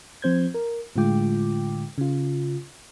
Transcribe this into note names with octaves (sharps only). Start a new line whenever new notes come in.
F3 C4 C5 G6 G#6
A#4
A2 D3 G#3 F4 G5 D6
C#3 F4